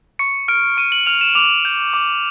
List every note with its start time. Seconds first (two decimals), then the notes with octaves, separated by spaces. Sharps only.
0.19 C#6 C#7
0.48 F6 D7
0.77 C#6 D#7
0.92 F#7
1.06 F6 F7
1.21 E7
1.35 D6 F7
1.65 G6
1.94 D6